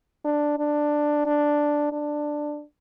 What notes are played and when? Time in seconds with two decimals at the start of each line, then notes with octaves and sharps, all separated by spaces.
0.25 D4
0.58 D4
1.26 D4
1.92 D4